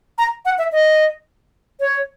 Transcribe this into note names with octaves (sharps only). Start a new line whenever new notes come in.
A#5
F#5
E5
D#5
C#5